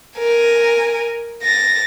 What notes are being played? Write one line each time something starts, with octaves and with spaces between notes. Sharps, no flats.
A#4 G#5
A6 A#6